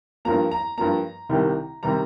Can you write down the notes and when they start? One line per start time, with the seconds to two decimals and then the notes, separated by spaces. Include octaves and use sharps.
0.25 G2 F3 A#3 A#5
0.51 A#5
0.78 G2 F3 A#3 A#5
1.29 C2 C3 D#3 G3
1.83 C3 D#3 G3 A#5